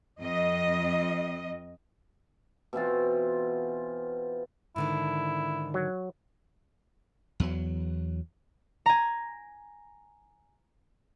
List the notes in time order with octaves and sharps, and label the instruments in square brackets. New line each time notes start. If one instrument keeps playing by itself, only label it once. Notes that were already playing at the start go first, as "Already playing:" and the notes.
[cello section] F2 D#5
[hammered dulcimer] B2 E3 C4 F4
[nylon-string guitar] G#2 D3 D#3 [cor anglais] E4
[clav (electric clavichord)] F#3
[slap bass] E2 F#3
[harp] G#5 A#5